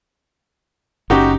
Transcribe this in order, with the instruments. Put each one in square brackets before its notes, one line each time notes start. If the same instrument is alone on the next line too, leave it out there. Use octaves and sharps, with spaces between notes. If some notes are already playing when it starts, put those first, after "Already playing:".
[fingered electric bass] F#1 C#4 [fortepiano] D#4 F#4 G4